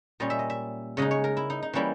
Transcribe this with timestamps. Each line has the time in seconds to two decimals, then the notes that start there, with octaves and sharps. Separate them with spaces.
0.20 A#2 G3 C#4 D#5
0.30 E5
0.39 D#5
0.50 E5
0.97 C#3 G#3 D#4 D#5
1.11 C#5
1.24 A#4
1.37 E4
1.50 D#4
1.63 D#4
1.73 E3 G3 A#3 C#4 E4